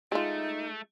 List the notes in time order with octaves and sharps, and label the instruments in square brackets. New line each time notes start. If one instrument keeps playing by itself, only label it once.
[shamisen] G#3 F4 [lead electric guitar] A3 [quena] D#4